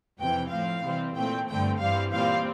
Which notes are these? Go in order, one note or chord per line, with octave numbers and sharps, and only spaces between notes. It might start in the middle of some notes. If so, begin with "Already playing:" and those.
F2 C3 E3 G5
A2 F3 C4 F5
C3 E3 G3 C4
A#2 A3 C4 G5
G2 D3 A3 C4 G5
G2 E3 G3 C4 F5
A#2 G3 C4 F5